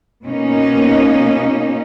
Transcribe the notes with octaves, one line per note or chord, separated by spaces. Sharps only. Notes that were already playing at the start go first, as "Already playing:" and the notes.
B2 A#3 C#4 D#4